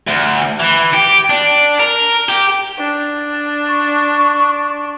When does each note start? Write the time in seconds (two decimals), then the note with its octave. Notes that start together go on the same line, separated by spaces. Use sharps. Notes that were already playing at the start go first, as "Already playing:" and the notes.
0.07 D2
0.60 E3
0.94 G4
1.30 D4
1.80 A#4
2.29 G4
2.79 D4
3.69 C#6